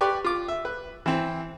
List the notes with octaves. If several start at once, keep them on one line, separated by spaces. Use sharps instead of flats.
G4 B4 D5 C#6
F4 D6
E5
B4
E3 C4